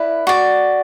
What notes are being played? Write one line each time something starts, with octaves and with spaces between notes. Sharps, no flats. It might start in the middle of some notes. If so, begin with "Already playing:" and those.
Already playing: E4 B4 D5
F#4 D5